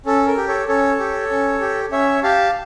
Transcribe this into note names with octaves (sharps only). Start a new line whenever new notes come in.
C#4 A4
A#4
G4
A4 C#5
C#4 A4 C#5
G4
C#4
G4
C#4 C#5 E5
G4 F5 A5